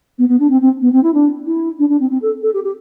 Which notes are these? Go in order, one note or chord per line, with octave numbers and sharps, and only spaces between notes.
B3
B3
D4
C4
C4
B3
C4
E4
D4
E4
D4
D4
C4
C4
A4
A4
G4
G4